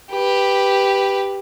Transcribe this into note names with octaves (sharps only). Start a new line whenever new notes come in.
G4 B4